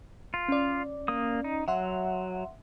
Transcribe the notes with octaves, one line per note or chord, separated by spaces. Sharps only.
F4
C#4 D5
A#3 D#6
D#4
F#3 E5 F#5 C6